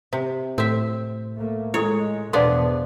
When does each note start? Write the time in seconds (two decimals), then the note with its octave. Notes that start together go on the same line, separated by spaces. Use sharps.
0.13 C3
0.58 A2 C4 E5
1.37 A3 A#3
1.74 G#3 E4 A4 C#5 D#6
2.33 E2 B2 F3 B3 D4 D5 C6